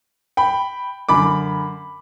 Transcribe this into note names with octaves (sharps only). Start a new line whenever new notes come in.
G5 B5
F#2 D3 B5 D6